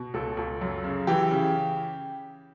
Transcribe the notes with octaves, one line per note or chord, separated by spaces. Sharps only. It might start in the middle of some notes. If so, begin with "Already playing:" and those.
Already playing: B2
C#2 A4
C#2
F#2
C#3
E3 G4
C#3